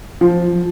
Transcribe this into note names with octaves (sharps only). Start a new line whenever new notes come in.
F3